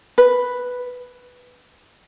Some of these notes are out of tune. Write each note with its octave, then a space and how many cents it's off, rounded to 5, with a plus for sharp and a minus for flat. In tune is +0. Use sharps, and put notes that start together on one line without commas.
B4 +0